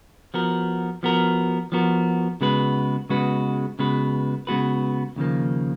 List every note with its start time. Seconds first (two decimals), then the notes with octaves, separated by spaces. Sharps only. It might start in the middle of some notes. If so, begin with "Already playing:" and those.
0.34 F3 B3 F#4 A#4
1.03 F3 B3 F#4 A#4
1.72 F3 B3 F#4 A#4
2.41 C#3 G#3 B3 F#4 B4
3.10 C#3 G#3 B3 F#4 B4
3.79 C#3 G#3 B3 F#4 B4
4.47 C#3 G#3 B3 F#4 B4
5.16 D#2 C#3 F3 A#3